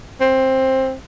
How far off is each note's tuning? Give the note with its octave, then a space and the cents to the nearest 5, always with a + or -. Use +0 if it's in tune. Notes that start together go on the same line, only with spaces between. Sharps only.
C4 +15